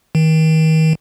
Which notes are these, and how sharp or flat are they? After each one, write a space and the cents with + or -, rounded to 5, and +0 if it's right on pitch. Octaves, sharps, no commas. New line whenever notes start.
D#3 +35